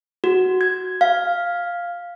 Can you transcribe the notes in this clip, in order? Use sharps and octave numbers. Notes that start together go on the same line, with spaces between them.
F#4
G#6
F5